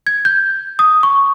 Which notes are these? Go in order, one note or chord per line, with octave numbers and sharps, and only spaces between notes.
G#6
G6
D#6
C#6